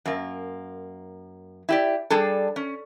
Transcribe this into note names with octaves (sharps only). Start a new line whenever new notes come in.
F#2 A#3
E4 G4 D5
G3 D4 G#4 A4
C#4